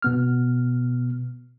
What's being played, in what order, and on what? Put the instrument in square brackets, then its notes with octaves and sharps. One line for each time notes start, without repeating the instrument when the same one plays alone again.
[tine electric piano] B2 B3 F6